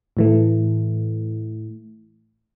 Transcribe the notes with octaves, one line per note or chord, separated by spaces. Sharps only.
A2 E3 A3